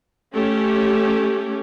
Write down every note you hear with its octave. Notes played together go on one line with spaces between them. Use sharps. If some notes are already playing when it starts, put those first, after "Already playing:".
A3 C#4 G4